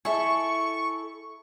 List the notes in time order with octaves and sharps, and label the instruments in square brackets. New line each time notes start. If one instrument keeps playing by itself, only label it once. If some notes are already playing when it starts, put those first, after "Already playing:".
[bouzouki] E4 A4 [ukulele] G#4 E5 [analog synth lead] C#6